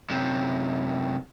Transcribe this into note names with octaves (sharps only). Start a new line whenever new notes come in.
F#2 C3